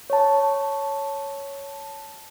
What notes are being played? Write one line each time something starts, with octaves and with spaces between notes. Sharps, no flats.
C#5 A5